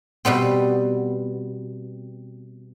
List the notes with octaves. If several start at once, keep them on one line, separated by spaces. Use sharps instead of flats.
B2 G3 B3 C4